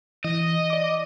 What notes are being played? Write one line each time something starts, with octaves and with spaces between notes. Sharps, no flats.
E3 D#5
D5 D6